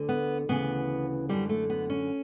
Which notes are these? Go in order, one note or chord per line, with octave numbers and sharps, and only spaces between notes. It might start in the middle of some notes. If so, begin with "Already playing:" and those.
Already playing: D2 D3
B3
D2 C#3 E3 B3
F#2 D3 G3
A3
B3
C#4